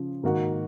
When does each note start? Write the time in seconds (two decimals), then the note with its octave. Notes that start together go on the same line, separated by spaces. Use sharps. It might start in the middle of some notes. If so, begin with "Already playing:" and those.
Already playing: C#3 F3
0.23 G#2 D#3 A#3 D#4 F#4